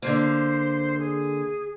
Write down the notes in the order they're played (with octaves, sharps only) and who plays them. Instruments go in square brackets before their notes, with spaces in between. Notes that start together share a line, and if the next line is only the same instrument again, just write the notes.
[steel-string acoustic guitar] D3 A#3 [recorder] C5
[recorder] G#4